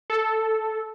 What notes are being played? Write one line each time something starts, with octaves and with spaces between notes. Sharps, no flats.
A4